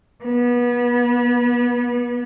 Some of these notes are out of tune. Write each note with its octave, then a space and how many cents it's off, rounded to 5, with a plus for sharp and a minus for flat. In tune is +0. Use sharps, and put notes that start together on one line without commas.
B3 -30